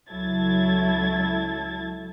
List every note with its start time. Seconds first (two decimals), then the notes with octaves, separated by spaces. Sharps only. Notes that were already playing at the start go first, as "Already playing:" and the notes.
0.10 C#2 F#3 E4 A4 G#6 A6